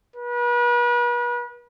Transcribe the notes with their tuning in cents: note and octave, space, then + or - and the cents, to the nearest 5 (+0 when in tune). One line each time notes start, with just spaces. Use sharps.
B4 -40